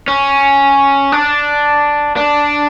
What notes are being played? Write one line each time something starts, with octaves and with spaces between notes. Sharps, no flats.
C#4
D4
D4